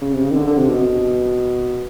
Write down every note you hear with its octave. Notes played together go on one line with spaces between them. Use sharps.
C#3
C3
C#3
D#3
D3
D3
C3
B2